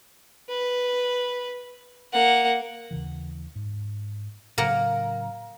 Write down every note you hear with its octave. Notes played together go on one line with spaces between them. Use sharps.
B4
A#3 F#5
D#2 C#3 E3
G#2
A2 C#3 F#3 A#3 A#4 F#5